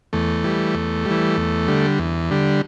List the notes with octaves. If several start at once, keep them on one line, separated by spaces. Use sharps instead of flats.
E2 A3
E3 G3
E2
E3 G3
E2
D3 G3
E2
D3 G3